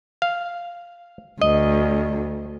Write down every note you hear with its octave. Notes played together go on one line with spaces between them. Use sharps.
F5
D2 D#5